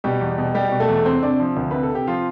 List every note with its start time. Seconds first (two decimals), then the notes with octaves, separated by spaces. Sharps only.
0.04 B2 G3 G4
0.21 E2
0.38 B2
0.55 G3 G4
0.69 B2 G4
0.80 A3 A4
0.89 E2
1.06 C3 C4 C5
1.23 C3 D4 D5
1.40 F3
1.57 D2
1.71 C3 B4
1.83 A4
1.90 C3
1.95 G4
2.07 F3 F4